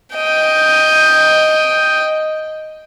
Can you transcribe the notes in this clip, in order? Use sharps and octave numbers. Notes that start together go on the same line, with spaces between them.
D#5 G5